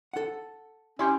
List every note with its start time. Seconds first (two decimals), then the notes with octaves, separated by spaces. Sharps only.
0.13 A4 F#5
0.99 C#4 E4 G4 B5 C6 G6